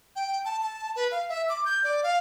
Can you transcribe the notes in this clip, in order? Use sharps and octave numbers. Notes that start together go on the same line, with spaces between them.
G5
A5
A5
B4
F5
E5
D6
G6
D5
F5